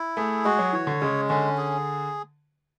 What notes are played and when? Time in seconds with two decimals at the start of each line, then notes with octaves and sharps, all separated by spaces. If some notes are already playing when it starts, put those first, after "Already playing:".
Already playing: E4
0.17 A3 G#4
0.45 G#3 F#4
0.59 F#3
0.73 E3 C#5
0.87 D3
1.01 C#3 G#3
1.30 D3 C#4
1.58 G#4